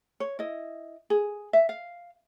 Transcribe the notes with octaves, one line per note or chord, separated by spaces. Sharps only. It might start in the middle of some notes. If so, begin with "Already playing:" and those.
C#5
E4 D#5
G#4
E5
F5